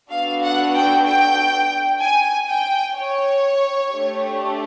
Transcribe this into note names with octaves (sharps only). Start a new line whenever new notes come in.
B3 D4 F#4 A4 F5
F#5
G5
G5
G#5
G5
C#5
A3 D4 G4